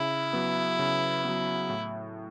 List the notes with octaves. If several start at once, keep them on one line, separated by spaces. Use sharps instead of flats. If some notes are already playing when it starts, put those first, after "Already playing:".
Already playing: C#3 E4
F#3 B3
C#3
F#3 B3
A2